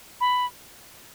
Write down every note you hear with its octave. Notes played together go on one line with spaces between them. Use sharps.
B5